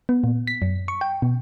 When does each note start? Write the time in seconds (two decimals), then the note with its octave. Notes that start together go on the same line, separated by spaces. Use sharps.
0.09 B3
0.24 A#2
0.47 B6
0.62 F#2
0.88 C#6
1.01 G5
1.22 B2